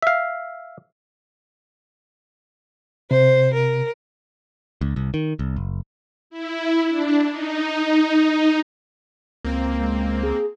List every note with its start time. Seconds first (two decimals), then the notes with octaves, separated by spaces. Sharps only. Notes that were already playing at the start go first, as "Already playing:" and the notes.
0.02 E5 F5
3.11 C3 C5
3.54 A#4
4.81 C#2
4.96 C2
5.14 D#3
5.39 C2
5.56 F#1
6.30 E4
6.88 D4
7.30 D#4
9.44 C#2 A#3 C4
9.80 G#3
10.23 G#4